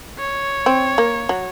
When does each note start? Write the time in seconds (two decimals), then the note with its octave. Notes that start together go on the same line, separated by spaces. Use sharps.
0.19 C#5
0.66 C4
0.98 A#3
1.29 F#3